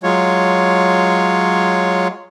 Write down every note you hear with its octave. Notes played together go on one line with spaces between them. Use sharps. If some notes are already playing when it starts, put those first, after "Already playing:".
F#3 G#3 F4 C#5